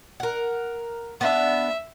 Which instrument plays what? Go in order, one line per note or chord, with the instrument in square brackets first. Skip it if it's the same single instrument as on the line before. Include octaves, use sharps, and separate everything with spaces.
[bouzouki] A#4 F#5
[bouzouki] B3 D4 [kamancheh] E5